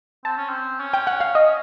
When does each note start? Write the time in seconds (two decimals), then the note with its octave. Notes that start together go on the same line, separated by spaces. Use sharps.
0.25 C4 A5
0.38 C#4
0.49 C4
0.80 C#4
0.94 G5
1.07 F#5
1.20 F5
1.35 D#5